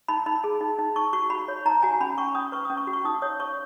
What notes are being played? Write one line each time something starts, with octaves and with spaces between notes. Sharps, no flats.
D#4 B5
D#4 B5
G#4
D#4
D#4
D#4 C#6
F#4 C#6
F#4 B5
C#5
D#4 A#5
F#4 G#5
C#4 B5
C#4 C#6
C#4 D#6
B4 C#6
C#4 D#6
C#6
F#4
C#6
D#4 D#6
C#5 D#6
C#5 C#6